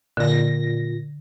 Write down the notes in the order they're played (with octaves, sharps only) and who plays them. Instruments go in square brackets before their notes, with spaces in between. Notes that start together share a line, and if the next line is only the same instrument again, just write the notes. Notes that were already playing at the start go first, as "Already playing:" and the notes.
[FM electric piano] A#2 A#6 [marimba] D3